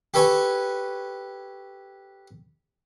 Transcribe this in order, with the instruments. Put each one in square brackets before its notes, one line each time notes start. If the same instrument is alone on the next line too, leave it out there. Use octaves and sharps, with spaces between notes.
[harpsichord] G4 A4 B4 C#5 G#5